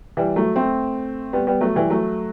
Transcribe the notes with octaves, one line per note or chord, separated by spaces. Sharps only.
E3 G3
F#3 A3
A3 C4
G3 B3
G3 B3
F#3 A3
E3 G3
F#3 A3